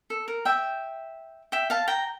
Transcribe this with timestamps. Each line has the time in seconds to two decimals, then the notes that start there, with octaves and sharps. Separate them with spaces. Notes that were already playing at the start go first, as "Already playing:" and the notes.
0.10 A4
0.28 A#4
0.45 E5 G5
1.52 E5 G5
1.70 F5 A5
1.88 G5 A#5